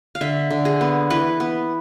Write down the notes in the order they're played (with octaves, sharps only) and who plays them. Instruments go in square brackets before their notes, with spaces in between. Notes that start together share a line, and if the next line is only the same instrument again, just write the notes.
[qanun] F5
D3 E5
D3
G#4
B3
E3 B4
B3